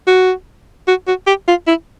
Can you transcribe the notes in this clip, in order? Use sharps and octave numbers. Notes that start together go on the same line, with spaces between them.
F#4
F#4
F#4
G4
F4
E4